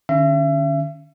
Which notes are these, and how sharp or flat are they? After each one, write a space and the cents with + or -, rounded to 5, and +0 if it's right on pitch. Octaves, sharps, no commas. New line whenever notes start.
D3 +45 C#4 +0 E5 +40